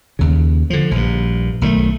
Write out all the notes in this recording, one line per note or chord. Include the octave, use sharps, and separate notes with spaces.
D#2 C#3
D3 F3
A#1 G2
B1 D#3 G3 A3